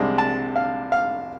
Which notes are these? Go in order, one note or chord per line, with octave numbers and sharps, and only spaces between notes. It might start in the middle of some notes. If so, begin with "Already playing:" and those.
Already playing: C2 C3 G#3 D4
A5
F5
F5